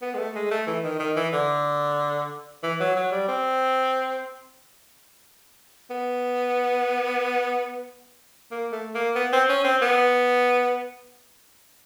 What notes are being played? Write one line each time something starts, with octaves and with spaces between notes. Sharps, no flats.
B3
G#3
A3
G#3
A3
E3
D#3
D#3
E3
D3
E3
F#3
F#3
G3
C4
B3
A#3
A3
A#3
B3
C4
C#4
C4
B3